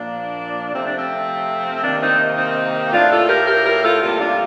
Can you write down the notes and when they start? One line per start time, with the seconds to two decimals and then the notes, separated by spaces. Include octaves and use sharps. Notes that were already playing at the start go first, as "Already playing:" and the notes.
Already playing: A#2 F3 A#3 D4
0.74 C3 F3 A3 C4
0.86 D4
0.97 C4
1.83 C3 D#3 A#3 D4
2.01 C4 D#4
2.38 C4 D#4
2.92 A2 A3 D4 F4
3.11 F4 A4
3.29 G4 A#4
3.47 G4 A#4
3.65 G4 A#4
3.83 F4 A4
4.02 C3 G3 A#3 F4 A4
4.20 D4 F4